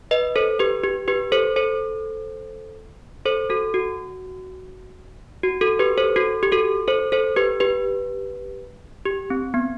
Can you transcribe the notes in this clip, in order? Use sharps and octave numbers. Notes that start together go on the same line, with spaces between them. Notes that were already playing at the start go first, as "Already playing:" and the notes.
B4 D#5
A4 C5
G4 B4
G4
G4 B4
A4 C5
A4 C5
A4 C5
F#4 A4
F#4
F#4
F#4 A4
G4 B4
A4 C5
F#4 A4
G4
F#4 A4
A4 C5
A4 C5
G4 B4
G4 B4
G4
C4
B3